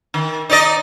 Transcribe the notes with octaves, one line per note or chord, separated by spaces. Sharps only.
D#3
D#4 D5 D#5